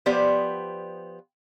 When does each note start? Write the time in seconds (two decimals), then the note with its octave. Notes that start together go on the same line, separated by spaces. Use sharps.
0.06 F3 B3 G4 C5 D5